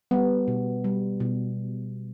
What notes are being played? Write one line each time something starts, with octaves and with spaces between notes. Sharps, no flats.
G3 B3
B2
G3
B2